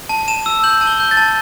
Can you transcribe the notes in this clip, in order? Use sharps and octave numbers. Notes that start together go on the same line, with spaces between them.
A5
A5 E7
E6
G6 F#7
A5
G7
G6
A6
A5